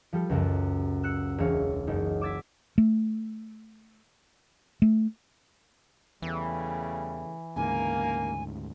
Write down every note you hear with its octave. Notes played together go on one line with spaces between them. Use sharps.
F3 G3 A4
C#2 F#2 F#3
E6 F#6 C#7
E1 G#4 C#5 F5
F#1 D#4
D6 E6 G#6 A6 B6
A3
A3
E2 C#3 E3 G3 A3
D2 G#2 C#3 A#3 G#5